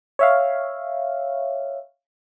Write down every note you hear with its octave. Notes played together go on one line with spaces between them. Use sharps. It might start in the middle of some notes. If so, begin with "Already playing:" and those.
C#5 E5 F5